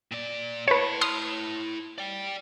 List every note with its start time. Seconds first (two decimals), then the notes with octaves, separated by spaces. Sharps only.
0.11 A#2 D5
0.68 E4 B4 C#5 A5
1.01 C6 D#6 F6
1.98 D5 G5